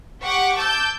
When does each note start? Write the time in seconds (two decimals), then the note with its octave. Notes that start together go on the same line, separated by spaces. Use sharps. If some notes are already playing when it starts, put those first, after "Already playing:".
0.22 G4 F#5 C#6 D6
0.56 A5 D6 E6 G6